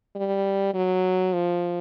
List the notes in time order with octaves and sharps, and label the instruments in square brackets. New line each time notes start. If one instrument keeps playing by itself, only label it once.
[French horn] G3
F#3
F3